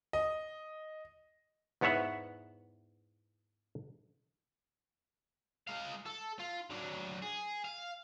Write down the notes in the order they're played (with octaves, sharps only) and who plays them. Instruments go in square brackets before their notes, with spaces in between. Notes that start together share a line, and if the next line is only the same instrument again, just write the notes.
[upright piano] D#5
[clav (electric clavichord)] E2 G#2 B3 C#5 E5 F#5
[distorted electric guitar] G#3 F5
A4
F4
F#3 D4
G#4
F5